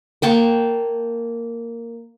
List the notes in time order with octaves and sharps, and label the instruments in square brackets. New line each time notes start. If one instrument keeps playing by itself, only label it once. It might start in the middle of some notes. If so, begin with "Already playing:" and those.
[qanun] A#3 G5 A5 C#6